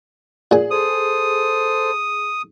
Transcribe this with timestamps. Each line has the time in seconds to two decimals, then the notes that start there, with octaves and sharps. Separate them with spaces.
0.51 A#2 G#4 G#5
0.71 A4 C5 D#6